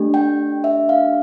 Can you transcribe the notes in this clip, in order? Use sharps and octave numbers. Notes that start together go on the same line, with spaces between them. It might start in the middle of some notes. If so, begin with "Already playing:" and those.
Already playing: A3 D4 G4
G5
E5
F5